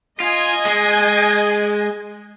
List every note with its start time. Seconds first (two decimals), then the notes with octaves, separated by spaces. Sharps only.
0.20 F4 D#5 G#5
0.65 G#3